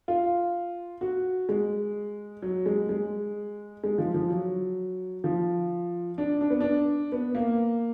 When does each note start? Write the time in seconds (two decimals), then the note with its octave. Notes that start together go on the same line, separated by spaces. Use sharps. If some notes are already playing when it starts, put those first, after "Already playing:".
0.08 F4
1.01 F#4
1.49 G#3
2.42 F#3
2.66 G#3
2.89 G#3
3.84 G#3
3.98 F3
4.14 F3
4.30 F#3
5.24 F3
6.18 D4
6.41 D4
6.50 B3
6.61 D4
7.12 B3
7.35 A#3